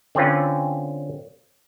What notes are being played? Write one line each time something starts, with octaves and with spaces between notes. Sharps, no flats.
D3 C4 C#4 F4 B4